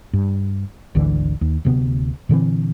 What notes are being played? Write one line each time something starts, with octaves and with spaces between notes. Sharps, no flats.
G2
G#1 D2 D3 E3
D#2
D1 D2 C3 B3
A#2 D3 E3 C4